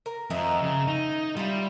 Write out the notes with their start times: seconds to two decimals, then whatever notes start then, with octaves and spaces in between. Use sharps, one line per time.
0.06 A#4
0.30 F2 D#3 E5 A#5
0.61 C#3
0.87 D#4
1.37 G3 E4 F4